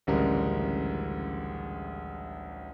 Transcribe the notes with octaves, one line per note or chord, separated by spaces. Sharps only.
A1 D2 C#3 G3 G#3 A#4